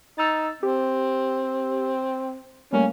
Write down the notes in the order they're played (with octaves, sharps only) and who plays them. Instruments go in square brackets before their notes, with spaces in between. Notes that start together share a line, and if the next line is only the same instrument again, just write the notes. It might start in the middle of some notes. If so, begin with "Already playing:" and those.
[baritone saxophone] D#4 [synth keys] E6 A6
[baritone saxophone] C4 [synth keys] G4
[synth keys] G3 A3 A#3 [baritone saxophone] C#4